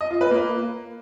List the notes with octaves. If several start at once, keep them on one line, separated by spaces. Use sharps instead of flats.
D#5
F4
B4
A#3